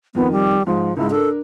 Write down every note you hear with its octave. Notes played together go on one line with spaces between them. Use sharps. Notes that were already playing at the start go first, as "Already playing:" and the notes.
F2 D#3 B3
G3
G#2 F3
C#2 G#2 E4
D4 A4 A#4